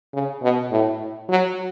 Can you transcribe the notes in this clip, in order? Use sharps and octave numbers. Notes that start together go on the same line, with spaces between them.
C#3
B2
A2
F#3